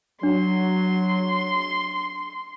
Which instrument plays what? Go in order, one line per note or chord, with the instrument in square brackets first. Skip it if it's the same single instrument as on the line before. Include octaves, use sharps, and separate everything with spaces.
[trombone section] F#3 [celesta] D4 [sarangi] C6